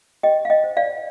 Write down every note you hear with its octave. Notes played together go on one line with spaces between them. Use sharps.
G4 D#5 G5
F5
D#5 G5
C5
D5 F5